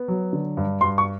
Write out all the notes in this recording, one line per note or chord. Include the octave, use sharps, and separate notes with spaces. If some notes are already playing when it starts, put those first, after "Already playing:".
Already playing: B3
F#3
D3
G2
G2 C6
C#6